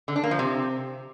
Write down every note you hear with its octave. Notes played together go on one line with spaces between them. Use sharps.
D3
D4
A#3
F3
C3